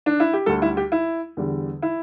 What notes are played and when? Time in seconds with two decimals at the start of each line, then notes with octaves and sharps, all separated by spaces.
0.06 D4
0.20 E4
0.33 G4
0.46 D2 D3 G3 A4
0.62 E4
0.77 G4
0.92 E4
1.37 E2 D3 G3
1.82 E4